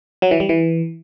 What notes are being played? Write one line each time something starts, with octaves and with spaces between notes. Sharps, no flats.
F#3
E3
G3
E3